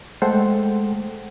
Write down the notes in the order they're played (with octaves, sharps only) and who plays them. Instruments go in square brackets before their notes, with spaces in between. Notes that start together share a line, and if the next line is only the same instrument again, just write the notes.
[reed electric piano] G#3 A3 A4 C5 F#5 G5